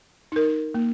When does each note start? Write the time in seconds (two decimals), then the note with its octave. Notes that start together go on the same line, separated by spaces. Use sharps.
0.32 D#4 A#4
0.74 A#3